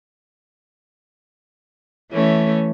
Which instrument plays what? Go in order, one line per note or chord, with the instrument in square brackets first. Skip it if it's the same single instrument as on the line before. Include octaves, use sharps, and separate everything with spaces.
[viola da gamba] E3 A3 C#4